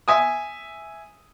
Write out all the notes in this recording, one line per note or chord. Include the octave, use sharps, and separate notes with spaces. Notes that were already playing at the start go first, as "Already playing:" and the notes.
E5 G#5 D#6